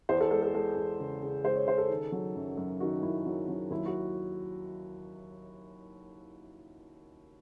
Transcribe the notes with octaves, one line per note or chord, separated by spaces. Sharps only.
E2 C5
A4
G#3 A4
A4
G#3 A4
E2
C#3
C#3
G#3 C5
C#5
C#3 C5
A4
D#3
F#3
F#2
F#2
D#3 F#4
F#2 E4
F#3
F#3
D#2 E4
F#4